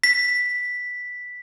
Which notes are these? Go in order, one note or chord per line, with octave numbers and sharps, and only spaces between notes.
B6